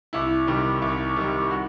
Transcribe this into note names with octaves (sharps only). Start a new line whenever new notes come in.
C2 E4
C3 D#3 G3
C2
C3 D#3 G3
F#4